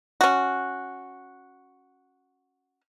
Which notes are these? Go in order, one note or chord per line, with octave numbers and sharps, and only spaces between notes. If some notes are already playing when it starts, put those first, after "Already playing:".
C#4 F#4